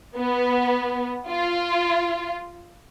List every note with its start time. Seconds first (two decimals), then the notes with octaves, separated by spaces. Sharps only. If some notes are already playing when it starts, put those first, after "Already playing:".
0.17 B3
1.29 F4